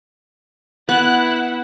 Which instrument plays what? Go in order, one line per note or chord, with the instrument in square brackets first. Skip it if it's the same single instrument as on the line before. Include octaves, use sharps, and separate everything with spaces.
[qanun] B3 [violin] E4 F#5 [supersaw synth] F#6